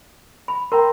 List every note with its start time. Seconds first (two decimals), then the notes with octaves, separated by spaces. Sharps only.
0.48 B5
0.72 A#4 G5 A#5 C6